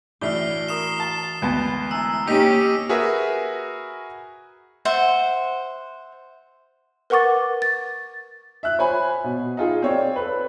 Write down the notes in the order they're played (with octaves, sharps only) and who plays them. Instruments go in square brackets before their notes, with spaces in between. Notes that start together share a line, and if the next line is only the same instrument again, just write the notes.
[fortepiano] A2 D4 [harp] E3 F#4 G#4 [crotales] F6 C7 G7
[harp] A#4 C#6 [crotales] D#6 C7 E7
[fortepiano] A5
[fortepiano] D2 B3 A5 [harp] G#3 G#5
[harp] E4 G#5 A#5 [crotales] E6
[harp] A#3 [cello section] C#4 G4 [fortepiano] D#4 [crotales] D#6 B6 D#7
[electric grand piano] F#4 G#4 A#4 B4 E5
[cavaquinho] C5 E5 F#5
[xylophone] A#4 B4 F#5 C#6 D6 A6
A6
[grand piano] E5 F#6
C5 C#5 G#5 B5
B2
D#4 F4 G#4
C4 C#5 D5
A4 B4